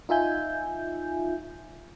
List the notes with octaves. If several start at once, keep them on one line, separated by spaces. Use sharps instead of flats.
D#4 F4 E5 G#5 G6